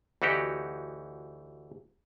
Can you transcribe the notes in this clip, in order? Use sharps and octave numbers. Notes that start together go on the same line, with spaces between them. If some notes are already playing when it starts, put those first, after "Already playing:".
D2 E3 D#4 F#4 G4